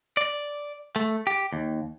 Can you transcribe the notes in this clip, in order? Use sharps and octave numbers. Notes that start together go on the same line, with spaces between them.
D5
A3
G4
D#2